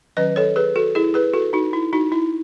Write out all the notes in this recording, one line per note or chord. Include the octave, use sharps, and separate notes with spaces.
D#3 F#3 C#4 B4 D#5
A4 C#5
G#4 B4
F#4 A4
E4 G#4
G#4 B4
F#4 A4
D#4 F#4
E4
D#4 F#4
E4